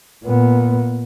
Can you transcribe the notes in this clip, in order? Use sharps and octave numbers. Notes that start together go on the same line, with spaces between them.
A#2 B3